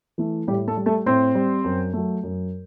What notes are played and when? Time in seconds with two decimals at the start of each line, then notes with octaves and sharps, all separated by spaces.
0.18 E3 A3
0.47 A2 G3 G4
0.67 A3 A4
0.77 G3
0.86 A3 A4
1.06 A2 C4 C5
1.35 G3
1.64 F#2
1.93 F#3 A3
2.23 F#2